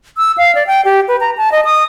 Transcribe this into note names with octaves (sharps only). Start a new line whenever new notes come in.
E6
F5
D5
G5
G4
B4
A#5
A5
D#5
D#6